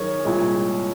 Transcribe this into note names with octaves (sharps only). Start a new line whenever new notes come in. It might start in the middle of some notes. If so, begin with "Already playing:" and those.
Already playing: F#2 D#3 G#4 A#4 C#5
C2 A#2 G#3